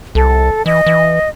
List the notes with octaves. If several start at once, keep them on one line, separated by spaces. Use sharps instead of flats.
C2 A4
E3 D#5
E3